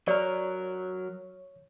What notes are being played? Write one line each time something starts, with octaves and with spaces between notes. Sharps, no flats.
F#3 A#4 C#5 D5